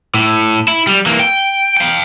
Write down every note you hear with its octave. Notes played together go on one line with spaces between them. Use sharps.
A2
E4
G3
E3 A#3
G5
F5 G5